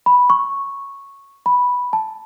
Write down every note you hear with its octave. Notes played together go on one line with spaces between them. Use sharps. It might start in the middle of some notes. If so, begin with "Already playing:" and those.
B5
C#6
B5
A5